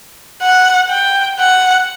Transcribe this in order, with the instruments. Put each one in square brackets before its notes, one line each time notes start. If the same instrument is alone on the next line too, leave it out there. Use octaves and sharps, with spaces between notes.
[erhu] F#5
G5
F#5